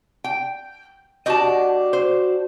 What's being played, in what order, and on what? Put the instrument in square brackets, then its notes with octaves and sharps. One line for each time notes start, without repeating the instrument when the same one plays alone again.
[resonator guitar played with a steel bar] G5
[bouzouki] D4 F#4 G4 [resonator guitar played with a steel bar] D#5 A5
[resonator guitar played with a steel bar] C5